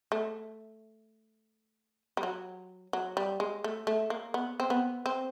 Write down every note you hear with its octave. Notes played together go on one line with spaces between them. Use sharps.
A3
G3
F#3
F#3
G3
G#3
A3
A3
A#3
B3
C4
B3
C4